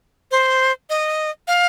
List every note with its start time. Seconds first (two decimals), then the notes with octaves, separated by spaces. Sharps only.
0.31 C5
0.90 D#5
1.48 F5